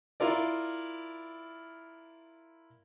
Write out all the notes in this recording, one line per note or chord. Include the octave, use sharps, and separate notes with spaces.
E4 F4 A#4 D5